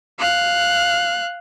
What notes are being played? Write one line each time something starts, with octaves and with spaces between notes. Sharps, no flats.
F5 F#6